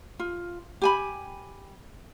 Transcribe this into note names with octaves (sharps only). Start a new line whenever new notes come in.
F4
G4 G#5 B5